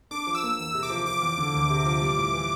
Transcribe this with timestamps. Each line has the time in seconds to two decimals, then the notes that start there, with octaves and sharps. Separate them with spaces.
0.11 D4 D6
0.27 F3
0.35 E6
0.43 A#3
0.59 E2 E6
0.74 C3
0.83 D6
0.90 F3
1.06 F3 D6
1.22 E2
1.38 D3
1.54 D2
1.70 C3
1.85 F3
2.02 G3
2.17 A2
2.33 E3